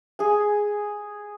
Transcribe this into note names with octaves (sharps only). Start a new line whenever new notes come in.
G#4 G#5